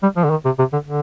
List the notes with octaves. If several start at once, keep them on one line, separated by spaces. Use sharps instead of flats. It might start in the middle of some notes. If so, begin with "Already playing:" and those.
G3
F3
D3
D#3
C3
C3
D3
D3